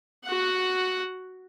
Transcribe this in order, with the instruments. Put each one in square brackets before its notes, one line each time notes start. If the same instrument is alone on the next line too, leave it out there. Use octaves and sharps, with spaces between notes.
[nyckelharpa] F#4 F#5